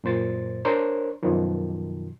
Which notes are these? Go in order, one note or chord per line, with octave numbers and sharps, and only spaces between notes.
F#2 A#2 C5 A6
D4 A#4 C5 C#5
F#2 B2 D#3 F3